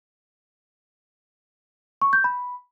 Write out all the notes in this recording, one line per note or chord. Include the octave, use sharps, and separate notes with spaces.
C#6
G6
B5